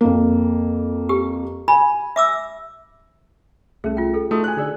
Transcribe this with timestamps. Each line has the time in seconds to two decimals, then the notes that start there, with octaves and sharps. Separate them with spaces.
0.01 F2 A#3
1.09 G4
1.68 G#5 B5
2.16 E5 D6 E6
3.84 C2 A3 C#4 G#4
3.97 F4 G5
4.13 G#4 A4
4.31 A3 D#4 F#4 A4 D#6
4.44 C5 G#5 F#6
4.57 D3 D#4 G#4 D5 E6